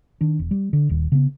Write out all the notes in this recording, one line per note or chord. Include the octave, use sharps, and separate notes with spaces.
D#3 D4
E1
G3
D3
D#1 D#2
C#3 B3